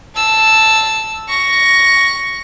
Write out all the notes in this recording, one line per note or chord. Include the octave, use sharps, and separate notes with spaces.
A5 E6
C#6 A#6